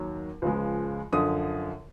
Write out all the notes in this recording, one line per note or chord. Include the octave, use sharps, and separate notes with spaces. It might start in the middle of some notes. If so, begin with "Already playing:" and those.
Already playing: D#2 D#3 F#3
C#2 C#3 F3 G#3
F#2 D3 F3 D#6